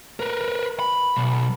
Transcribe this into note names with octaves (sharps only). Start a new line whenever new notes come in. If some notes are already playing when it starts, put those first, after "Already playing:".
A#4 B4
B5
B1